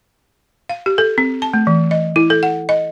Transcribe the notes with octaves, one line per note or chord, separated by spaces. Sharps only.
F5
G4
A4
C4
A5
A3
E3
D#5
E4
A4
F#5
D#5